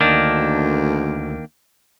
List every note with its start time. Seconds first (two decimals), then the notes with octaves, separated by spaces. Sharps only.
0.01 D2 D#3 A#3 D4